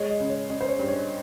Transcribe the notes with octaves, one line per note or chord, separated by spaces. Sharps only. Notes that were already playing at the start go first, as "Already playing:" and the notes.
Already playing: G#3 C#5
D#5
C#3
C#5
C#4 D#5
C5
C#5
G2
C#5